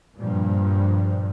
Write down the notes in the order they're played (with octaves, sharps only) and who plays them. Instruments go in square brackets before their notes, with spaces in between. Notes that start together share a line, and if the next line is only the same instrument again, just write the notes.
[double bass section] G2 A#2 F3 G3